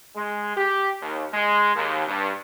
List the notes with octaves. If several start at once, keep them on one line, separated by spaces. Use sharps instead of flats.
G#3
G4
D#2
G#3
D#2
G2